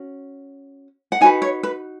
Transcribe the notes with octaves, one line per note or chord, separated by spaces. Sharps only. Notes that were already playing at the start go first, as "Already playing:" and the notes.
Already playing: C#4 F#4
F#5
D#4 F#4 B4 G#5
C#5
B4